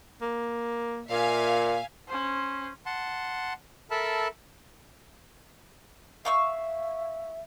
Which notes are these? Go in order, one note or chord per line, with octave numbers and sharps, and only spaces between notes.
A#3
A#2 E5 F5 G#5
C#4 C5
F#5 A5 C6
A4 A#4 E5 A5 B5
E5 F5 C#6 E6